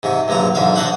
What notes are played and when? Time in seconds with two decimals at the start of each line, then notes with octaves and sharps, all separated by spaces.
0.03 G#2 C3 C#6
0.28 A#1 G2 D3 F#3 A#5
0.55 B1 G#2 D3 E5 F5
0.75 D4 C5 D#5 E5 F#5 C6